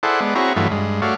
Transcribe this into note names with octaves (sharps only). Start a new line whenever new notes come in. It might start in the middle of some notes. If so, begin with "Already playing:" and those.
E4 G#4 A4 C5 D5 F#5
G#3 B3 D5
C4 E4 F#4 G#4 C#5 A#5
G2 E3 F#3 A3 F4
G2 G#3
A3 F#4 C#5 D5 F5